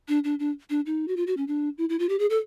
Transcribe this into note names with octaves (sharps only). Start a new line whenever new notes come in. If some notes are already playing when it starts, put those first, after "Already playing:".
D4
D4
D4
D4
D#4
F#4
F4
F#4
C#4
D4
E4
E4
F4
G4
G#4
A4